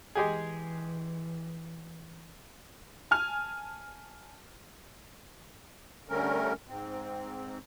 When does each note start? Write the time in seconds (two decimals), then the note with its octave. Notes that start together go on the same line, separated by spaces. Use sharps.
0.15 E3 G#3 G4 G#4
3.11 G#5 A5 F6 F7
6.09 D3 G3 A3 C#4 A#4
6.68 G#2 C4